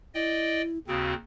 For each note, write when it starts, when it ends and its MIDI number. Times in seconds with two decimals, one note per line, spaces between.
0.15 0.79 64
0.15 0.62 74
0.15 0.62 75
0.15 0.62 79
0.88 1.14 39
0.88 1.14 49
0.88 1.14 60
0.88 1.14 66